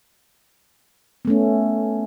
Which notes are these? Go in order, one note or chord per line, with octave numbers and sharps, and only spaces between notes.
A3 B3 C#4